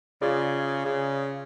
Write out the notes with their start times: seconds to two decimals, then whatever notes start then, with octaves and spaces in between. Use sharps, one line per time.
0.22 C#3 F4 G#4 D5
0.85 C#3